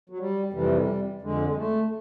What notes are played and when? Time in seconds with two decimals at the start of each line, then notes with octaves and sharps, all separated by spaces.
0.10 F#3
0.19 G3
0.52 F2 C3 E3 G3
1.21 F2 D3 G#3
1.49 G#3
1.56 A3